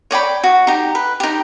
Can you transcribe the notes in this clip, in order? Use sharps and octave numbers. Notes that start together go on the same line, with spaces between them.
C#5 D5 G5 B5
F#4
D#4 G4
B4
D#4 G4